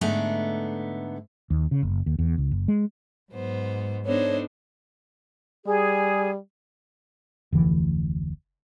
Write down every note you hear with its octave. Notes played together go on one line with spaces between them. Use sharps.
G#2 D3 A3 B3 A#5
D#2
C#3
F#1
D#2
E2
C#2
F#1
G#3
G#2 F#3 B3 C5
B3 D4 D#4 A4 C5 C#5 D#5
G3 G#4
F1 D2 E3